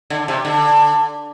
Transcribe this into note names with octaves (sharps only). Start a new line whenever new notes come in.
D3
C3
D3